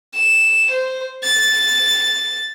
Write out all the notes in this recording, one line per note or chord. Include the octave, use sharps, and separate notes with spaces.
E7
C5
A6